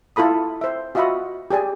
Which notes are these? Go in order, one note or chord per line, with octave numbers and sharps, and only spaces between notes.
E4 F4 A4 B5 D#6
C5 E5
F4 F#4 D#5 E5 F#5 B5
G4 G#4 D5 G#5